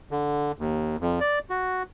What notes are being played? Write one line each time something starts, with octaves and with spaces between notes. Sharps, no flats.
D3
D#2
F2
D5
F#4